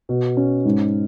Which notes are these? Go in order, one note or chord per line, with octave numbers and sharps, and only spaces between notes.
B2
C#4
G#2